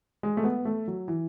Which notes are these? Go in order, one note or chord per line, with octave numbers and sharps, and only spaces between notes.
G#3
A3
B3
A3
F#3
E3